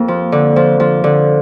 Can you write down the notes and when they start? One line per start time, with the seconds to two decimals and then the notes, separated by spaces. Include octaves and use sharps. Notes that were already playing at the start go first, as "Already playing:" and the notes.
Already playing: F2 A#3
0.08 F3
0.32 D3
0.56 F3
0.80 F3
1.04 D3